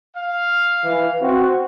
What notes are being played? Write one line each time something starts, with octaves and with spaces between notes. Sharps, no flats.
F5
E3
C4 F#4